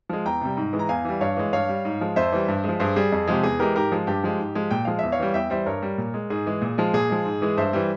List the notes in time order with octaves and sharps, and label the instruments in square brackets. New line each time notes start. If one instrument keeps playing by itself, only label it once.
[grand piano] F3 G#3
E2 G5 A#5
C3 G3
G#2
E3 G#3
A#5
E2 F5 G#5
E3 G3
G2 C#5 F5
E3 G#3
G2 C#5 F5
G3
G#2
F3 G#3
F2 C5 E5
E3 G3
G2
G#3
F3
G2 G#4 C5
G3 G#4
F2
C3 F3 G#3 G4
E2 G#4
E3 G#3 G4 A#4
G#2 G4 A#4
F3 G#3
G2 G4
F3 G#3
G#2
F3 G#3
A#2 G5
F3 G#3 F5
E2 E5
C#5 F5
E3 G3
E2 E5 G5
E3 G3 C5 E5
G2 A#4 C#5
G3
A#2
G#3
G#2 G#4
E3 G#3
A#2
F3 G#3
A#2 G#4
F3 G#3
G#2
E3 G#3
G2 C5 E5
E3 G3